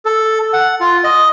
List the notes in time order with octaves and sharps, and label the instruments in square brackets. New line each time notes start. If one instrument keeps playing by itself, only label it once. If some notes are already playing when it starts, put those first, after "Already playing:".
[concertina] A4
F#5
F4
D#5